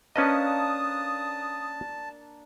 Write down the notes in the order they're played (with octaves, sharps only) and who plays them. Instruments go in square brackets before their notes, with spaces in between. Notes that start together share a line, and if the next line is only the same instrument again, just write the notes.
[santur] A#3 D4 [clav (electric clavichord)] C#4 B4 D#5 [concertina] A5 [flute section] D#6